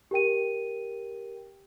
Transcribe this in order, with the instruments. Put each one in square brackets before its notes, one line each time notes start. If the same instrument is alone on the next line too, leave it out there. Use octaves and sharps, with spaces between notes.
[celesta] G4 A#4 G5 D#7